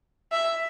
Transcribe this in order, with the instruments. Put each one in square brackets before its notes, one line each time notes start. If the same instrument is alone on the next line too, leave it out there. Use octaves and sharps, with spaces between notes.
[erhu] E5